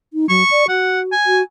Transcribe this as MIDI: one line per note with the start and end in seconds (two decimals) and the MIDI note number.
0.14 0.28 63
0.29 0.43 54
0.29 0.66 85
0.51 0.64 74
0.69 1.13 66
0.69 1.00 78
1.12 1.40 80
1.26 1.42 66